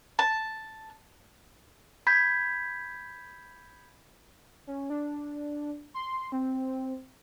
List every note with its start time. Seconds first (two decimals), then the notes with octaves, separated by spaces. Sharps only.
0.19 A5
2.07 B5 G6 G#6 B6
4.67 C#4
4.90 D4
5.94 C6
6.32 C4